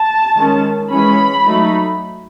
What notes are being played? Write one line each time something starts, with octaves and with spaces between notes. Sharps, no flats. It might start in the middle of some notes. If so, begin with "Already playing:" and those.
Already playing: A5
D#3 G#3 C#4
E3 G#3 C#4 B5
F#3 A3 D#4